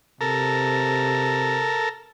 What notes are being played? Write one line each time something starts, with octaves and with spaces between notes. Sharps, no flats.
C3 A4 A#4